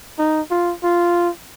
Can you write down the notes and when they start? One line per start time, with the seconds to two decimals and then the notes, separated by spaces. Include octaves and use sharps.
0.19 D#4
0.51 F4
0.84 F4